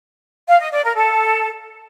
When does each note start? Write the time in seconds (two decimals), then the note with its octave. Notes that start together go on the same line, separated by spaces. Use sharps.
0.48 F5
0.60 D#5
0.72 D5
0.84 A#4
0.96 A4